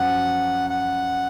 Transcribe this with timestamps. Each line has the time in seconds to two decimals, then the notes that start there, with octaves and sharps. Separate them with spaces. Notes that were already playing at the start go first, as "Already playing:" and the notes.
Already playing: F#2 F3 F#5
0.70 F#5